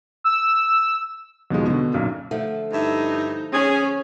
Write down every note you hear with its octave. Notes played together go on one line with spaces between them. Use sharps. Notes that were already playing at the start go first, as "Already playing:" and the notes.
E6
D#2 B2 F3 G#3
B2 D3
B1 F#2 A#2
D3 F3 A3
G2 D#4 E4 E5
C#4 G#4